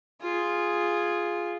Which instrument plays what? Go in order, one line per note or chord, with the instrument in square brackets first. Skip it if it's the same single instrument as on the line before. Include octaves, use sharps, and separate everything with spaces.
[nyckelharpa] F4 G#4